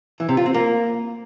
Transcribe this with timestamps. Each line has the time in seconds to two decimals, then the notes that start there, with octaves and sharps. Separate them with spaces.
0.20 E3
0.29 C3
0.37 F4
0.46 C4
0.54 A#3